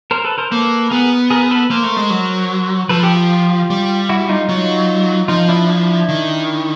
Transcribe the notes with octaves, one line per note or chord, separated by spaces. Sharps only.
A#4 C5
A4 B4
A#4 C5
A#3 A4 B4
B3 G#4 A#4
G#4 A#4
A4 B4
A#3 A#4 C5
A3
G#3
F#3
F3 A4 B4
G4 A4
F4 G4
G3
E4 F#4
D#4 F4
F#3 D#4 F4
F3 D#4 F4
D4 E4
D4 E4
D#3